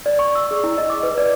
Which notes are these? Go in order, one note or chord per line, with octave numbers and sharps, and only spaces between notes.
D5
C#6
E6
G#4
E4
D#5
D6
B4
D5